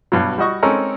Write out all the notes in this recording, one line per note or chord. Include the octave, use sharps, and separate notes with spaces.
G2 B2 F#3
G3 F#4 D#5 C#6
G#3 C4 C#4 D#4 A4 A#4